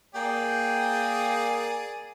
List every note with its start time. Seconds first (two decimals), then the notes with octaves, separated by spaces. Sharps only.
0.15 A#3 G#4 D5 G5